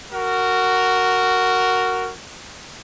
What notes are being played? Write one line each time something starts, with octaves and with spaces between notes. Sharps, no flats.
F#4 A#4